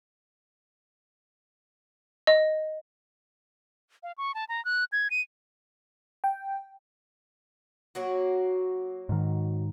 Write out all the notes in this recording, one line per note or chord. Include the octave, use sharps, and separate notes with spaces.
D#5
F5
C#6
A5
A#5
F#6
G#6
D#7
G5
F#3 A#3 F#4
G#2 D#3